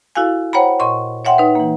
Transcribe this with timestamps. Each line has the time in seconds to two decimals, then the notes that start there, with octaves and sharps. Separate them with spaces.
0.15 E4 F#4 A4 F5 G#5
0.53 C5 C#5 F#5 G5 A#5 B5
0.80 A#2 D#5 C6 C#6
1.25 C#5 E5 F#5 G5 C6
1.38 D#4 B4
1.55 E3 A#3